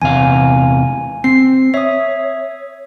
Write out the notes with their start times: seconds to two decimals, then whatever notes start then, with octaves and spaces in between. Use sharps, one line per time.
0.02 E2 C3 F5 G#5
1.24 C4 C7
1.74 C#5 E5 D#6